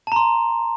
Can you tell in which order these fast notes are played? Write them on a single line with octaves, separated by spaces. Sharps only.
A5 A#5 C6